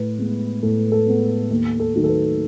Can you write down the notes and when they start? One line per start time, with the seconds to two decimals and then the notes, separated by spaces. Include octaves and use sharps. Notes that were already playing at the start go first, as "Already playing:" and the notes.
Already playing: A2 B4
0.19 G#3 B3
0.63 A2 A4
0.92 A4
1.07 G#3 B3
1.50 D#2
1.80 A4
1.94 D#3 F#3 A3
2.04 A4
2.09 B4